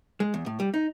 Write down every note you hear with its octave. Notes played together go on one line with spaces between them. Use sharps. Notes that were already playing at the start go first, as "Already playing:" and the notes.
G#3
E2
A2
G3
D#4